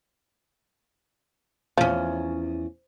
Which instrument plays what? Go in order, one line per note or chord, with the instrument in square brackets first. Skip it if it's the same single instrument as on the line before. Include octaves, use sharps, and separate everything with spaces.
[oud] E2 C#4 [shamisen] F3